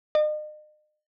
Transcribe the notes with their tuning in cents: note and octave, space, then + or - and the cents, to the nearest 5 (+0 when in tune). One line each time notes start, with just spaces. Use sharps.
D#5 -40